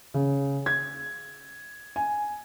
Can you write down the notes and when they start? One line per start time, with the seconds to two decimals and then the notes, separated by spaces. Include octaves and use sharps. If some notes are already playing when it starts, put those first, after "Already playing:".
0.14 C#3
0.66 G#6
1.96 G#5